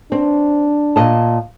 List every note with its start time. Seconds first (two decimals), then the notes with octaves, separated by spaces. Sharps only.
0.12 C4 D4
0.96 A#2 D#5 A5